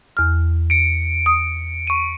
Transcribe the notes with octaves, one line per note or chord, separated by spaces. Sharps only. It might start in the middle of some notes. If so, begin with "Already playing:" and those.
E2 F6
C#7 D7
D#6
C#6 D#7